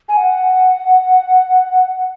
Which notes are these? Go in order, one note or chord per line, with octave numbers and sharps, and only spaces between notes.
G#5
F#5